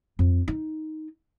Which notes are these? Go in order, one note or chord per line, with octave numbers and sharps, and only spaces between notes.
F2
D#4